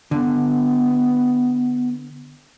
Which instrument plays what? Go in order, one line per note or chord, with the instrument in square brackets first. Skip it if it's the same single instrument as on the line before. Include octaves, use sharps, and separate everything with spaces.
[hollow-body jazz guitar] D3 [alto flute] B3